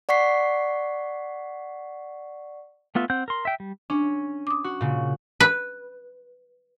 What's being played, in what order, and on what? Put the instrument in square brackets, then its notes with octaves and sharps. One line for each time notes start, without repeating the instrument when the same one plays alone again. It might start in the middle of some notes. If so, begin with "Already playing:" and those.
[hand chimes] D5 F#5 C#6 B6 C7
[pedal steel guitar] A3 B3 F4 E5
C4 F#5 G6
A#4 C6
E5 G5
G3
[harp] C#4 [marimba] D4
[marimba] D6 D#6
[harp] F#4
A#2 C#3
[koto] B4